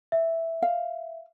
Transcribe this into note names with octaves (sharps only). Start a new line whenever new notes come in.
E5
F5